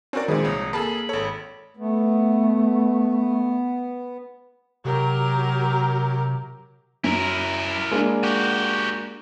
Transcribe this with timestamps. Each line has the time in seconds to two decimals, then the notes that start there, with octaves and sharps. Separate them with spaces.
0.13 C4 C#4 F#4 A#4 D5
0.28 A#2 D#3 F3 G#3 C4 G#4 B5
0.45 C2 D#4 C#5
0.73 A#3 G#4 A4 A5 B5
1.09 G#1 A4 C#5
1.77 A3 B3
4.85 C3 F#3 G4 A#4
7.04 F#2 E4 A#4
7.91 G#3 A#3 D4
8.23 F#4 G4